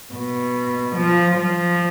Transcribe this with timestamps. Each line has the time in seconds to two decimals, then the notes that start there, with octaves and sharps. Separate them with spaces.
0.13 B2
0.97 F3
1.39 F3